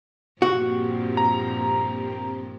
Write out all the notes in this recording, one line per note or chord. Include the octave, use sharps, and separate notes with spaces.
G2 A#2 F3 A#3 C4 F#4 G4
A#5